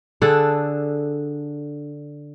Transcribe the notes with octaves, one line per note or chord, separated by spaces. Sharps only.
D3 D4 G#4 A4